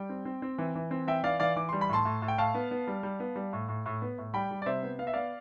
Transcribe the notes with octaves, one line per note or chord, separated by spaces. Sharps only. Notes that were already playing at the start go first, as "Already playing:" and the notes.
Already playing: G3 G5
C4
C4
C4
E3
E3
C4
E3 E5 G5
E3 D5 F5
E3 D5 F5
E3 D6
G3 C6
B5
A2 A5 C6
A2
A2
G5
A2 F5 A5
B3
B3
G3
G3
B3
G3
A2
A2
A2
B3
A2
G3 G5 B5
G3
D5
C3 C5 E5
B3
B3 F5
E5
B3 D5 F5